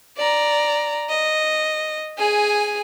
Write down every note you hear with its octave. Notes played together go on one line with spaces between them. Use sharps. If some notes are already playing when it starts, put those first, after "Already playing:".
D5 A#5
D#5
G#4 G#5